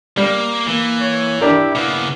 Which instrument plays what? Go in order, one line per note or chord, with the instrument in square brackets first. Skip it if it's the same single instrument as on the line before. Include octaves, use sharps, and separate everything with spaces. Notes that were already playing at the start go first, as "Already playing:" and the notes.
[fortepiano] G3 [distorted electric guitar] A#3
[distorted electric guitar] E3 [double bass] A#3
[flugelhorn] C#5
[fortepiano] D4 A#4 [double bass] E4 [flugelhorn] G4
[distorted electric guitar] C#3 A#3 [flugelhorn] B3